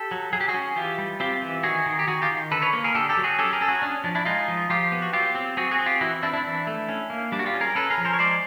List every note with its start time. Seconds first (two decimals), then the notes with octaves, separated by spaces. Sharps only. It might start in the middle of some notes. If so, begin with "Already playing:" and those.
Already playing: G4 A4
0.11 F#3
0.33 F#3 G#4
0.41 G4
0.48 F#4 G#4
0.54 C#4
0.76 E3 F4 G4
0.98 G3
1.20 C4 F4 G4
1.42 E3
1.63 D#3 F#4 G#4
1.86 D#3
1.99 G4
2.07 D#3 F#4 G#4
2.22 F4 G4
2.30 D#3
2.51 D3 A4 B4
2.62 B4 C#5
2.73 A#3
2.84 G#4 A#4
2.94 D3 G4 A4
3.09 G4 A4
3.17 F#3
3.24 F#4 G#4
3.39 C#4 G4 A4
3.53 G#4 A#4
3.61 C#4 A4
3.68 F#4 G#4
3.82 C#4 D4
4.04 F3 D4
4.15 D4 E4
4.25 G#3 D#4 F4
4.48 F3
4.69 F3 F4 G4
4.92 B3
5.02 F#4
5.13 F#3 F4 G4
5.35 C4
5.57 C4 F#4 G#4
5.71 F#4 G#4
5.79 C4
5.86 F4 G4
6.01 E3 E4 F#4
6.23 C4 D4 E4
6.33 D4 E4
6.44 E3
6.67 A3
6.89 C#4
7.10 A#3
7.32 G3 D4
7.39 F#4
7.46 F4 G4
7.54 C#4
7.61 G#4 A#4
7.75 C#4 A4 B4
7.90 G#4 A#4
7.98 F3
8.05 A#4 C5
8.13 C#5
8.19 G#3 C5 D5